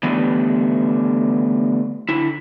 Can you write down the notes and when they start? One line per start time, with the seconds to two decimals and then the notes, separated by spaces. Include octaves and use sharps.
0.03 D3 E3 G3 A3 B3 D4
2.09 D3 E4